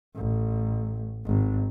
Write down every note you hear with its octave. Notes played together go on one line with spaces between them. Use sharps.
A1
G#1